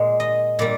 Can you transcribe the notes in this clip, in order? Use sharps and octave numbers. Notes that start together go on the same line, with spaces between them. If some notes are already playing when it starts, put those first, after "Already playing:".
Already playing: A#2 G#3
D#5
A#2 G3 D5